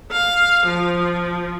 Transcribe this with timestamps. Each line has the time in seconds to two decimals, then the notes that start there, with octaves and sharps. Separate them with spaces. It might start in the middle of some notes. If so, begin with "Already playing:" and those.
0.12 F5
0.66 F3